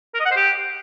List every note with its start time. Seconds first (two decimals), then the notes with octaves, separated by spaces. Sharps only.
0.14 A#4
0.20 D#5
0.25 F#5
0.31 C5
0.37 G4